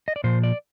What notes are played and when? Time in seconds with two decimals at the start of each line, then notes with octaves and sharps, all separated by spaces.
0.08 D#5
0.16 D5
0.24 A#2 F3 C5
0.43 D5